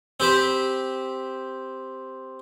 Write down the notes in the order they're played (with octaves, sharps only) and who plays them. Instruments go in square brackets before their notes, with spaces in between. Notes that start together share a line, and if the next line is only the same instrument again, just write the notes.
[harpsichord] C4 G4 C5 B5